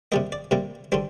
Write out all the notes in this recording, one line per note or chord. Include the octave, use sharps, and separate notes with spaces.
C3 G3 A#3 D#5
D5
C3 G3 A#3
D3 G3 D4 C5